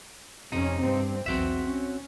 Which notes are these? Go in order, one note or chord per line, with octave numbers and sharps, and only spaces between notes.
F2 C3 C#4 D#4
G2 C4
B1 E2 C4 F#4 E5
C#4